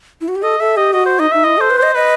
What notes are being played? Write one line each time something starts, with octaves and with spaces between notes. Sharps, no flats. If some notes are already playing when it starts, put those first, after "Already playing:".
E4
F#4
G4
A4 D#5
A4 E5
G4 D#5
F#4 D#5
C5
D#4 D#5
D#4 E5
E4 D#5
A4 C5
B4
C5 D#5
B4 D#5